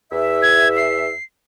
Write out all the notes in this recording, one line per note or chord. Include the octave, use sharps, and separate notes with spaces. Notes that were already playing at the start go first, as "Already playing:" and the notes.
E2 E5
G#6
C7